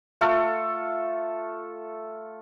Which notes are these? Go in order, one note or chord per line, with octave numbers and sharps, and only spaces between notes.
A3 F4 A4